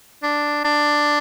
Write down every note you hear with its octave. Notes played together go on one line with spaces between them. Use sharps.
D4
D4